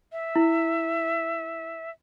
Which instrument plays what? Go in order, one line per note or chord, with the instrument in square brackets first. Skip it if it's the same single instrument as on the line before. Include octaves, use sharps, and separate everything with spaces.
[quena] E5
[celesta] E4